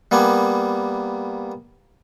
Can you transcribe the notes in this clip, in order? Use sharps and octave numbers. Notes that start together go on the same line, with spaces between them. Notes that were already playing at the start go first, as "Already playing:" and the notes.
G3 A#3 B3 G#5